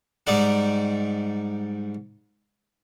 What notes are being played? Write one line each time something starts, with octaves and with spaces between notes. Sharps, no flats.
G#2 G3 D#4 D5 F#5